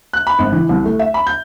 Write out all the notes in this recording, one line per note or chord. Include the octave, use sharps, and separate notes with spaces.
F#6
B5
G#1
E3
C2
A3
E5
B5
G6